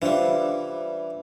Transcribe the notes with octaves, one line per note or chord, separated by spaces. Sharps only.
E3 G3 D4 F4 C5